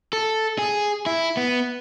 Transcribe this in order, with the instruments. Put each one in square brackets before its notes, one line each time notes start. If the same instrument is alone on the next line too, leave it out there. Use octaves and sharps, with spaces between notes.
[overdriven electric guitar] A4
G#4
E4
B3